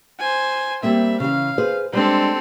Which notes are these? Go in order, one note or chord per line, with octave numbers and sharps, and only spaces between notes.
C5 G#5
G3 A#3 C4 E5
C#3 E3 F5
G#4 B4 C5
G3 G#3 C4 D4 A4